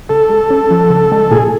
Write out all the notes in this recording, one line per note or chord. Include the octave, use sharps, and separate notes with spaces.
C#3 A4
G#3
C#4
F3
C#3
G#3
A#2 G#4